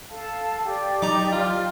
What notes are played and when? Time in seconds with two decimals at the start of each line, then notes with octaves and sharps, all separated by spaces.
0.11 A4 F5 A5
0.64 G4 D5 G5
1.02 F#3 D#4 A#5 D6
1.32 F4